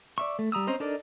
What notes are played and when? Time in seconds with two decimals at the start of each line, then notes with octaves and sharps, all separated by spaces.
0.18 D5 E5 C#6
0.39 A3
0.52 G3 A#5 D#6 E6
0.67 C4 C#4 C5 D#5 A#5
0.80 D4 D#4 A4 A#4 D5